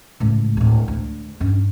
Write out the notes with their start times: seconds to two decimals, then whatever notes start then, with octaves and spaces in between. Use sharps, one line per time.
0.20 C#2 A2
0.57 D1 A2
0.88 D2
1.40 G2 C#4